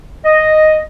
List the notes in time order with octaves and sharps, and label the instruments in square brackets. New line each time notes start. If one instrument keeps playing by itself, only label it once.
[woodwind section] D#5